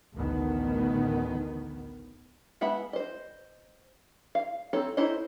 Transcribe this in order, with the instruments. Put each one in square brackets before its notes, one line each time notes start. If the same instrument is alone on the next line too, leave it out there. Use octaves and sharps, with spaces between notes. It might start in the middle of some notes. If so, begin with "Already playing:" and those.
[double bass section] A1 D2 D#3 B3
[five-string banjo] G#3 B3 E5 F#5 B5
C5 D#5
F5
C4 D#4 A4 C#5
D#4 E4 C5 C#5 D#5